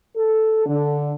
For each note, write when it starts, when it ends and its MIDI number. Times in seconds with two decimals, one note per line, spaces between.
0.17 0.64 69
0.66 1.13 50